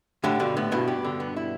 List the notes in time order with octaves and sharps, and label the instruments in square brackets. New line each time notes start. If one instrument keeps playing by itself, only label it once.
[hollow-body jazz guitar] A2 D3 [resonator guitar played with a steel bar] G4
[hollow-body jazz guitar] G2 B2 [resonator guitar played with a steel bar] D3
[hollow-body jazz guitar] A2 [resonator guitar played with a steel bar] B3
[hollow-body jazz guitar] G2 B2 [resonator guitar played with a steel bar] E4
[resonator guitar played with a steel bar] G4
D3
B3
E4